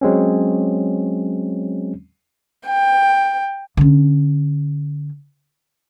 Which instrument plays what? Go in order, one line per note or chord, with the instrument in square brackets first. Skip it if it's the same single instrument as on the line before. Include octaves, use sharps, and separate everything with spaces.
[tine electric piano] F#3 G#3 C4 C#4
[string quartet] G5
[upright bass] D3 C#4